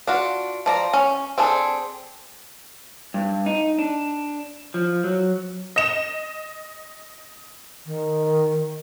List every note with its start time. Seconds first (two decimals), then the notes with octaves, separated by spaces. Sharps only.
0.07 D4 F4 F#4
0.66 F3 D5 A#5
0.93 C#4
1.38 C4 D4 G#4 A4
3.14 G2
3.46 D#4
3.79 D4
4.74 F3
5.04 F#3
5.76 D#5 E7
7.85 D#3